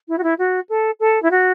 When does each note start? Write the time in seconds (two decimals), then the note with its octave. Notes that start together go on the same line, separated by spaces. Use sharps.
0.08 E4
0.18 F#4
0.23 E4
0.38 F#4
0.69 A4
0.99 A4
1.22 E4
1.31 F#4